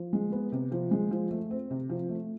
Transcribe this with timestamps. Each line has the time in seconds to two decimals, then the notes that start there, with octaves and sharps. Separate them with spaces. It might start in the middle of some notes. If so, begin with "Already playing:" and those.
Already playing: F3
0.13 G#3
0.32 B3
0.52 C3
0.72 F3
0.91 G#3
1.11 F3
1.31 A3
1.50 C4
1.70 C3
1.89 F3
2.09 A3